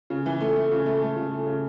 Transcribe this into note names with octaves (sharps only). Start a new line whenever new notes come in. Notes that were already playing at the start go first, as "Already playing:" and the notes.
C#3
E3
A3
A3
C#3
A3
A3
C#3
A3
C#3